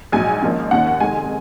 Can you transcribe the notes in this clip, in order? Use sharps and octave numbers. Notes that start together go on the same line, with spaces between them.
A#1 G#2 F#3 G#5
G#1 G#2 F3 A#3 C#4
D#2 D#3 A#3 C#4 F#5
F1 F2 D#3 G#3 G#5